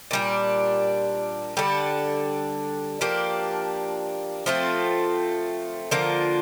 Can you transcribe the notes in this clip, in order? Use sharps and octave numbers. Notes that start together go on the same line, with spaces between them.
A#2 G3 D4
D3 G3 D4 A4
F3 A#3 D4 G4
F3 A3 C4 F4
D3 F3 A#3 F4